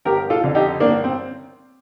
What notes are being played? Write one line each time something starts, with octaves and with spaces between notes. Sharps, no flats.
G1 G4 A#4
F4 A4
F2 D3
D#4 G4
G1 A#3 D4
C4